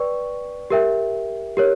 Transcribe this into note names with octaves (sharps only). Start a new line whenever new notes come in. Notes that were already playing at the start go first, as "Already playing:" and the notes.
Already playing: B4 D5 G5 C#6
G4 A#4 E5 G5
G4 A#4 C#5